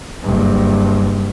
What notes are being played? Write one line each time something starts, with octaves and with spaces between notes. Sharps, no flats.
F#1 G2